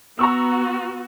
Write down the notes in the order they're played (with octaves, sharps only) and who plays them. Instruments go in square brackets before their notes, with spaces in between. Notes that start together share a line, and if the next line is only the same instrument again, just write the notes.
[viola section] B3 F#4 [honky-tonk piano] A#5 C#6 E6